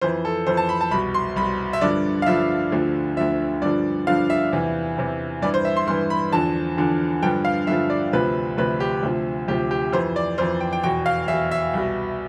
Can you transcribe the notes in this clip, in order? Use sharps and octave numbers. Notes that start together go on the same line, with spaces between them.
F2 E3 C5
A4
F2 E3 C5
A5
B5
A5
C2 B2 B5
C6
C2 B2 B5
E5
G2 D3 F3 D5
F5
G2 D3 F3 E5
D2 D3 F3
D2 D3 F3 E5
G2 D3 F3 D5
G2 D3 F3 F5
E5
E2 C3 E3
E2 C3 E3
G2 E3 D5
C5
E5
C6
G2 E3 C6
B5
E2 D3 F3 A5
E2 D3 F3
G2 D3 F3 G5
F5
G2 D3 F3 E5
D5
D2 C3 F3 B4
D2 C3 F3 B4
G4
D2 C3 F3
D2 C3 F3 G4
G4
F2 E3 C5
D5
F2 E3 C5
G5
G5
E2 B2 G5
F5
E2 B2 E5
E5
C2 B2